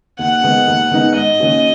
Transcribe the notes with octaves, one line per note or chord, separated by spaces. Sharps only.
D#2 F#5
D#3 G#3 B3 D#4
D#2
D#3 G#3 B3 D#4
G#2 D#5
D#3 A#3 C#4 F#4